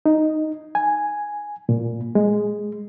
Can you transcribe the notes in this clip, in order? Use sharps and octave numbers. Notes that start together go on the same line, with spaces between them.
D#4
G#5
A#2
G#3